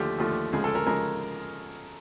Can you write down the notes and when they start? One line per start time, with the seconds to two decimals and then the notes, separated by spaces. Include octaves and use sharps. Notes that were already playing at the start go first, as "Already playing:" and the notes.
Already playing: D#2 D3 F3 A3 G4
0.18 D#2 D3 F3 A3
0.53 D2 C#3 F3 G#3 G#4
0.64 A4
0.75 A#4
0.86 C#3 F3 G#3 A#4